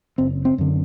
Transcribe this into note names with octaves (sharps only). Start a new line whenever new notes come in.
F#1 C4
C4
F#2 D3